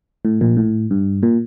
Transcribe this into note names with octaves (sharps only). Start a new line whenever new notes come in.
A2
A#1 A#2
A2
G2
A#2